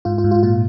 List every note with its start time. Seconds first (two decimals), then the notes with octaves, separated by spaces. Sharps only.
0.05 G#2 F4
0.18 F4
0.24 G#2
0.31 F4
0.43 A#2 F4